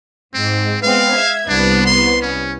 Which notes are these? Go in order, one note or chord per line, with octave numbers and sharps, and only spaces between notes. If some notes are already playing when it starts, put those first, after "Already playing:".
G#2 C4
G#3 B3 C4 F5
E5 G#6
C2 B3 D4
C6
C#4